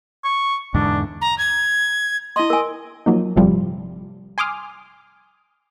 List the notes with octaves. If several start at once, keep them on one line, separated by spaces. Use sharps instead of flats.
C#6
E2 G#2 D3 D4
A#5
G#6
E4 D#5 C6
A#4 G#5
F3 F#3 A#3 D#4
G1 A2 C3 F3 G3
G#5 C6 D6 D#6 F6